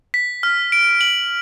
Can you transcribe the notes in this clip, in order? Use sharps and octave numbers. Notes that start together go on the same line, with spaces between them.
B6
F6
D7
F#7